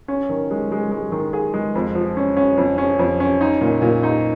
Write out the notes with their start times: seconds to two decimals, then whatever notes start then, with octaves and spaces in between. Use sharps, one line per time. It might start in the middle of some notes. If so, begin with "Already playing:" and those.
0.08 C#4
0.30 D#3
0.51 G#3
0.72 G#3
0.91 G#3
1.12 D#3
1.33 G#4
1.54 G#3
1.75 F2
1.95 F3
2.17 C#4
2.37 C#4
2.57 F2
2.78 C#4
2.99 F2
3.20 C#4
3.41 D#4
3.61 A#2
3.82 A#2
4.03 D#4